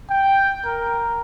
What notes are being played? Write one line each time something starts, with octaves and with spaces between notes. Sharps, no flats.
G5
A#4